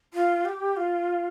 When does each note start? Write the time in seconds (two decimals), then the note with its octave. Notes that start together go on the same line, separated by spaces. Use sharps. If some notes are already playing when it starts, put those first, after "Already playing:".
0.14 F4
0.45 G4
0.77 F4